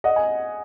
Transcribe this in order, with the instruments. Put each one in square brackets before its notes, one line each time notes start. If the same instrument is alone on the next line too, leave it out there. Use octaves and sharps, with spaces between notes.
[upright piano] D#5 F#5
G#5